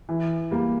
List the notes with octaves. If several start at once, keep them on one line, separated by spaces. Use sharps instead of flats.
E3
G3 A#3